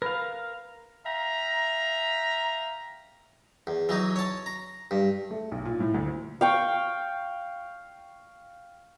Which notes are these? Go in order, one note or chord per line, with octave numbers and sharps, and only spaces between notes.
A#4 B4 F5
E5 F5 G5 A#5
E2
E3 F#3 D#4
C#5 A5
A#5
G2
A3
B1
A#2
A2
D2
F5 G5 C#6